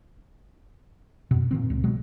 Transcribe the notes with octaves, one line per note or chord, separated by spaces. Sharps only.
F#2 B2
A#2 D#3 C4
C#2
B2 F#3 G#3